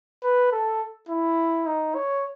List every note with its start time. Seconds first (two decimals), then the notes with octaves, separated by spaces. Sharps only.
0.23 B4
0.52 A4
1.09 E4
1.67 D#4
1.95 C#5